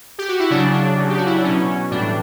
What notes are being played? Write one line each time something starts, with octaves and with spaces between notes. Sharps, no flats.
G4
F#4
E4
C#3 F#3 D4
D4
C#3 F#3
G4
F#4
E4
D4
B2 F#3 C#4
A2 E3 G3 D4